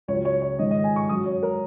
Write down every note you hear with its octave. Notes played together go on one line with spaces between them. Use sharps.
C#2 C#3 F#3 C#5
C#5
C#5
G#2 D#3 G#3 D#5
D#5
G#5
C#6
F#2 F#3 D#6
C#5
A#4